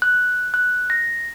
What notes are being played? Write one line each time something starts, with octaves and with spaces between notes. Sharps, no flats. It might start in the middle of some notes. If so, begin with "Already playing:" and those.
F#6
F#6
A#6